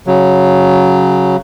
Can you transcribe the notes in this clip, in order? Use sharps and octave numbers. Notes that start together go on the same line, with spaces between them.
C#3 F#3